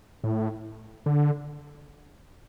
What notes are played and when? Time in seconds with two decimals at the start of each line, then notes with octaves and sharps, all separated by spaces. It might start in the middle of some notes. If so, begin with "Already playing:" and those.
0.24 A2
1.06 D3